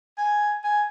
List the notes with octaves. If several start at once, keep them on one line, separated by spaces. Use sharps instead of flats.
G#5
G#5